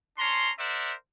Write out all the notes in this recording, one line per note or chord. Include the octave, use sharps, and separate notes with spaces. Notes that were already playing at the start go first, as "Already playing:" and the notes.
C#4 D4 A#5 C6
A#4 C5 D5 E5 F#5